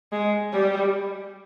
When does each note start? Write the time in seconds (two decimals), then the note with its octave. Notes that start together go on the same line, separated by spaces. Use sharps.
0.12 G#3
0.53 G3